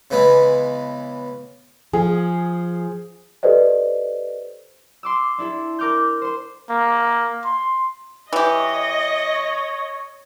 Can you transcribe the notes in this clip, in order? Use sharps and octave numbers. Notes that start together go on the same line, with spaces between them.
C#3 E3 G#3 B3
F3 G#4
G4 A4 B4 C5 D5 D#5
C6 D6 E6
D4 E4 A4
A#4 D6 F6 G6
C5 C6
A#3
C6
E3 G4 C#5 D#5